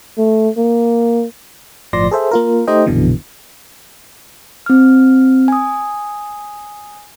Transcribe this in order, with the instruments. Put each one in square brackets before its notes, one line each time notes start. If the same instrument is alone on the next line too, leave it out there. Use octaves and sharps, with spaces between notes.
[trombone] A3
A#3
[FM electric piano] G1 A2 F3 D5 C6 A#6
G#4 A4 C5 E5
A#3 F4 A#4
A3 D#4 G4 C5 D#5 G5
A#1 F#2 B2 D3 E3
[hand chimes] C4 F6
G#5 D#6